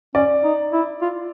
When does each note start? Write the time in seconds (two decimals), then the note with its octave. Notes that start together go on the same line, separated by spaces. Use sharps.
0.15 C#4 D5
0.44 D#4
0.73 E4
1.02 F4